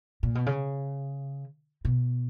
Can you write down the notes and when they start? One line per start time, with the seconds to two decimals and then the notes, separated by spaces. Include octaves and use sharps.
0.23 A#2
0.35 B2
0.46 C#3
1.85 B2